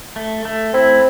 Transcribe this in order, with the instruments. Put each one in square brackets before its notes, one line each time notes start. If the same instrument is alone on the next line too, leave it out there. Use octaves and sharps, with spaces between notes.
[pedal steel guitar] A3
A3
[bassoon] C4 [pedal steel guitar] E4